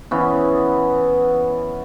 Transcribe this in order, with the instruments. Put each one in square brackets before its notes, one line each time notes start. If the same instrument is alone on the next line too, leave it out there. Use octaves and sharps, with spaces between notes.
[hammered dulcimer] E3 B3 C#4